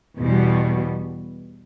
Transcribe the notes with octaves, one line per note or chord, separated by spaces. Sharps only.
E2 B2 G3